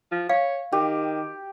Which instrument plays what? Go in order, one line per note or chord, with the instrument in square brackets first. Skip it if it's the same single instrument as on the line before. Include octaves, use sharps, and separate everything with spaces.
[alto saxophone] F3
[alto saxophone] C#5 [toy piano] F5
[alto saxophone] D#3 [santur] G4